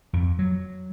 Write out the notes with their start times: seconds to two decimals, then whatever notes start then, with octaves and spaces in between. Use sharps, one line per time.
0.13 F2
0.39 F#3